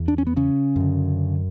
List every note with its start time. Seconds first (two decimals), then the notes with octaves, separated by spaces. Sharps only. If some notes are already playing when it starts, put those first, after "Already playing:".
Already playing: E2
0.08 D4
0.18 C#4
0.27 B3
0.36 C#3 C#4
0.76 F#2 D3